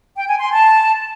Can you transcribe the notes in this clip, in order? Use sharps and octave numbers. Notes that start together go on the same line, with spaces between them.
G5
G#5
C6
A5